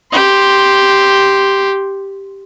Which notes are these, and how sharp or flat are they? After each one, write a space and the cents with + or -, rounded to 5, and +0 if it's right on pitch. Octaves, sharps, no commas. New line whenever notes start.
G4 +0 C6 +0